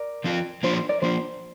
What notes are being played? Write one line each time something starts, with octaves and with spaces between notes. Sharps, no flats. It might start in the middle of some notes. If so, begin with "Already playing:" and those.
Already playing: A#4 D5
F3 C4 F4
F3 A#3 D4 F4 C5
C5
A#4 D5
F3 A#3 D4 F4 C5